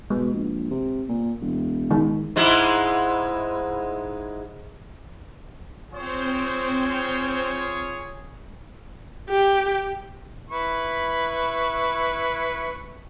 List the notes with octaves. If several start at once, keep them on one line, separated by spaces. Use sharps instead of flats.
B2 G#3
A#1
C3
A#2
E1
D#3 G#3
G#2 G#3 E4
C4 F4 G#4 C5 C#5
G4
E4 B4 C#6